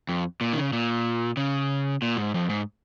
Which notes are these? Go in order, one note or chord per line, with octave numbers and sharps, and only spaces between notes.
F2
A#2
D#3
C#3
A#2
C#3
A#2
G#2
F2
G#2